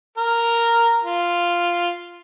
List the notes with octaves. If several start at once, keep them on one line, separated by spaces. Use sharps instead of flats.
A#4
F4